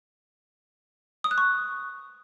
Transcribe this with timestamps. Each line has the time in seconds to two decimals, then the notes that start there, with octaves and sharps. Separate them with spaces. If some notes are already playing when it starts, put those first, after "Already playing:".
1.24 D#6
1.31 F#6
1.38 C#6